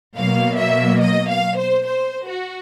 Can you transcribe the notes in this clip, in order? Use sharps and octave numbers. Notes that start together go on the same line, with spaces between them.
B2 F#3 A#3 F5
E5
D#5
F5
C5
C5
F#4